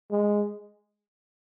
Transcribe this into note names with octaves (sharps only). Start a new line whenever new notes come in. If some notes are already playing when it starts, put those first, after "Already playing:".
G#3